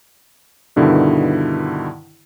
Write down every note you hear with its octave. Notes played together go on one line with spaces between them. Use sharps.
G2 B2 D3 D#3 E4